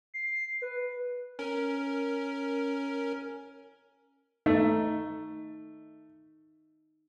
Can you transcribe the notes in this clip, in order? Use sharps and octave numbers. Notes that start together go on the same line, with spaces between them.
C7
B4
C#4 A#4
A3 D#4